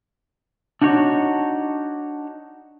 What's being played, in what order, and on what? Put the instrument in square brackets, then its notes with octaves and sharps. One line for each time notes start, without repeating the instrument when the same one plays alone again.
[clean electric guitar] D4 D#4 F#4 C#5